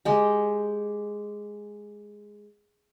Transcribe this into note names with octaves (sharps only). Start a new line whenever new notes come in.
G#3 G4